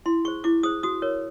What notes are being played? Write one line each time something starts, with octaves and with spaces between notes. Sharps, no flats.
E4 C6
G#4 C5 C#6
E4 D6
G#4 C5 D#6
F#4 D#6
A#4 C#5